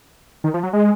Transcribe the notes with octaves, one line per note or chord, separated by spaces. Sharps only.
D#3
F3
F#3
G#3